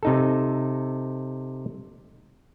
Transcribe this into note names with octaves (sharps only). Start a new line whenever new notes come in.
C3 D#4 A4